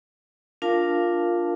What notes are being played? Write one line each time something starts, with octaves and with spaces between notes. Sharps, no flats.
D4 F4 A#4 F5 A5